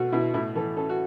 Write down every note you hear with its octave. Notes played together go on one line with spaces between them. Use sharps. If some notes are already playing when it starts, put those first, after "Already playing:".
Already playing: B2 A3 F#4
B2 E4
A2 E4
E3 A4
C#4 A4
F#4